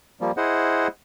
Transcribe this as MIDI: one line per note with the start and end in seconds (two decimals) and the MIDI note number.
0.21 0.31 53
0.21 0.31 55
0.21 0.31 58
0.37 0.88 64
0.37 0.88 68
0.37 0.88 72
0.37 0.88 75
0.37 0.88 78